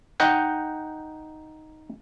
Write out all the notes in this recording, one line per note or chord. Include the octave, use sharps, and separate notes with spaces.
D#4 D#5 F#5 G5